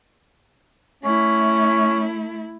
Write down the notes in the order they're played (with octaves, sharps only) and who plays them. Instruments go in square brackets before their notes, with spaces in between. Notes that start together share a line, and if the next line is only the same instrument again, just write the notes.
[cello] A3 E4 [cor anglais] C#4